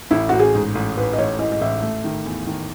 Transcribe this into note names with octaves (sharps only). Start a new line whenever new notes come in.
A1 E4
A1 F#4
G#4
G#2
A1
A1 B4
D#5
A1 C#5
E3 D#5
D#5
A1 E5
A3
D#3
E2
D#3